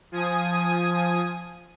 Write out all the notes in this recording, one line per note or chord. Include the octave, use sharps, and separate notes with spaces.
F3 G#5 D#6